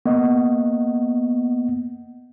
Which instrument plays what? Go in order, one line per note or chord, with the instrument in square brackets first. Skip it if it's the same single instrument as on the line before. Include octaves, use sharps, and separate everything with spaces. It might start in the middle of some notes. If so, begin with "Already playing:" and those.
[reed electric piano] A#3 D#5 [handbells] B3